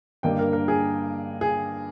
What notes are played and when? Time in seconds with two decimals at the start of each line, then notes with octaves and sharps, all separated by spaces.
0.23 G2 D3 G3 A#3 D#5 G5
0.39 A#4
0.53 A#4
0.68 G#4
1.41 G#4